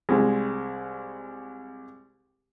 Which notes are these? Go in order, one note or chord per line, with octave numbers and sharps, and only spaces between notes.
C2 G#3